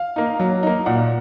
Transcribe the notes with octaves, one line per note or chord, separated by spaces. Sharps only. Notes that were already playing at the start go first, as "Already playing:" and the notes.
Already playing: F5
A#3 D#4
F#3
A#3 D#4
A#2 F#5